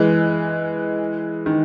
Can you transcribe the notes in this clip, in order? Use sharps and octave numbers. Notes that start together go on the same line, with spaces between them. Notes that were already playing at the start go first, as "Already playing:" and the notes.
Already playing: E3 G#3
D#3